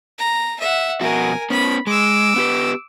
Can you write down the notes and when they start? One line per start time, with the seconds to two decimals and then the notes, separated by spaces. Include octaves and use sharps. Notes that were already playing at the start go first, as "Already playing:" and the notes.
0.19 A#5
0.60 E5 F#5
1.01 F2 B2 F#4 A#4 G#5
1.50 B3 C#4 B5
1.87 G#3 D6 E6
2.36 B3 G4 B4